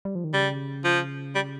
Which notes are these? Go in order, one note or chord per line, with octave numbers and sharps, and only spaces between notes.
G3
F3
D#3
C#3 G3
F3
G3